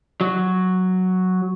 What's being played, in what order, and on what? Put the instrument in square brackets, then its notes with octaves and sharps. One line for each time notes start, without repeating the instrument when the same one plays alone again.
[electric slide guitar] F#3